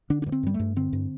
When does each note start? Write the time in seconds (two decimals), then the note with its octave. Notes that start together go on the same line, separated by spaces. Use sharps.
0.10 D3 D4
0.22 D4
0.26 G2
0.32 C4
0.43 G2 G3
0.54 A3
0.59 G2
0.76 D3 C4
0.93 G2